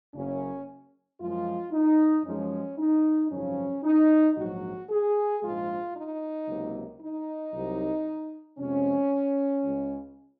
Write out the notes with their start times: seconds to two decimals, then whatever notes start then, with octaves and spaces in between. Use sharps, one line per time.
0.13 F#1 F#2 C#3 C#4
1.19 F#2 F3 G#3 F4
1.72 D#4
2.25 F#2 F3 G#3 C#4
2.78 D#4
3.30 G#1 F#2 C#3 F3 C#4
3.83 D#4
4.36 A#1 G#2 F#3 F#4
4.89 G#4
5.42 A#1 G#2 F3 G#3 F4
5.95 D#4
6.47 C#2 C3 F#3 A#3
7.00 D#4
7.53 C2 C3 F#3
8.58 F2 C3 F3 G#3 C#4
9.64 C#2 C#3 G#3